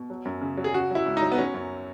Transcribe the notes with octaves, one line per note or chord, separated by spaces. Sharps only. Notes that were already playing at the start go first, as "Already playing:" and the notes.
Already playing: B2
F#3
F#2
C#3
F#3
G#4
C#3 F#4
F#3 E4
C#2
F#3 D#4
B3
F#3 C#4
F#2